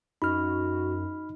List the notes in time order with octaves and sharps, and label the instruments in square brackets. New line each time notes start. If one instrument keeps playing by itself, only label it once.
[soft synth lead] F#2 [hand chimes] D#4 [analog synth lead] F#4 [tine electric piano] B5 F6